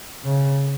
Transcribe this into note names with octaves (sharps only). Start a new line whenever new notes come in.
C#3